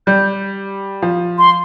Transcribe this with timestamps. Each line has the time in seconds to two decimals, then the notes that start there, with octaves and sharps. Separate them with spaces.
0.07 G3 G6
1.02 F3
1.38 C6